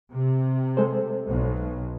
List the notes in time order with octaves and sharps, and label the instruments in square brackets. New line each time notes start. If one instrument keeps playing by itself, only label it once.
[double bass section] C3
[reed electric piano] G#3 A4 C5
[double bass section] B1